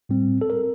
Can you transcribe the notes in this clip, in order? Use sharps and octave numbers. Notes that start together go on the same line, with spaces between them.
A2 G3 C4
A4
A#4